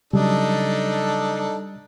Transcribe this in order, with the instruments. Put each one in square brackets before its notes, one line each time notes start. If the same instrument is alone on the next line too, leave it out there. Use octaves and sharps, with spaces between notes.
[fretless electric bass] C#3 F#3 [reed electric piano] G3 [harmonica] D4 D#4 A4